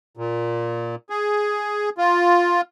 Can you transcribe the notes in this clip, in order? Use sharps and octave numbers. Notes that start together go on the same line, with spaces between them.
A#2
G#4
F4